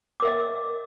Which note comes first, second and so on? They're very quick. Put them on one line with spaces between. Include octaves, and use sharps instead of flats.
D6 A#4 E5 D#5